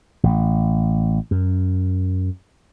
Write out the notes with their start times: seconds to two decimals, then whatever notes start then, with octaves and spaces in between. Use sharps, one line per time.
0.23 A1
1.31 F#2